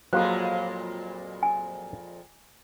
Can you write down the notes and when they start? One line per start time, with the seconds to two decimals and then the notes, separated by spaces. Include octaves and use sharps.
0.13 F2 A#2 F#3 G#3 A#3 F4 A4 C5
1.43 G#5